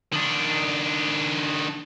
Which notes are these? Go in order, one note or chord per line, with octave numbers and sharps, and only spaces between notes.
D#3 D4